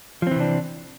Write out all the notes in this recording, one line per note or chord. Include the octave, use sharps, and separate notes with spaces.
C3 E3 F3 C4 D4